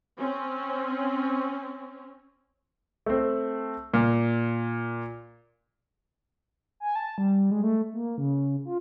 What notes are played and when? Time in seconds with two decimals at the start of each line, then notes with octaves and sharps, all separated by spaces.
0.17 C4 C#4
3.06 A3 C4
3.94 A#2
6.80 G#5
6.95 A5
7.18 G3
7.51 G#3
7.63 A3
7.94 A#3
8.18 C#3
8.65 F4